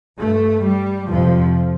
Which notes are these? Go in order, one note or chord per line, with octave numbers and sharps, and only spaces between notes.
G2 A3
G3
F2 C3 F3